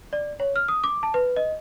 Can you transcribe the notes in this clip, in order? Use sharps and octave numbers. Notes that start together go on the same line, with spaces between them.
D5
C#5
F6
D#6
D6
A5
B4
D#5